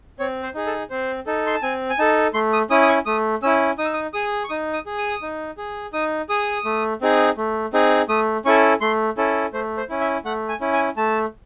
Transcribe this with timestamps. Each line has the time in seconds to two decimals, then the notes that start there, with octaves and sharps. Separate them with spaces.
0.19 C4 C#5
0.43 C5
0.54 D#4 G#4
0.66 A4
0.90 C4 C5
1.26 D#4 A4
1.47 C6
1.54 A5
1.62 C4 G#5
1.90 G#5
1.99 D#4 A4 A5
2.34 A3 C6
2.53 D#6
2.70 C#4 E4 D#6
2.82 D#6
2.89 C#6
3.06 A3 D#6
3.43 C#4 E4 E6
3.78 D#4 D#6
3.85 E6
3.94 D#6
4.13 G#4 D#6
4.44 C#6
4.49 D#4 D#6
4.73 D#6
4.86 G#4
4.98 D#6
5.22 D#4
5.58 G#4
5.93 D#4 D#6
6.29 G#4 D#6
6.65 A3
7.01 C4 D#4 G#4
7.37 A3
7.73 C4 D#4 G#4
8.09 A3 D#6
8.45 C#4 E4 A4 C#6
8.81 A3 C6
9.17 C#4 E4 A4
9.53 A3 C5
9.77 C5
9.89 C#4 E4
10.01 E5
10.25 A3 F#5
10.49 G#5
10.60 C#4 E4
10.73 G#5
10.97 A3 A5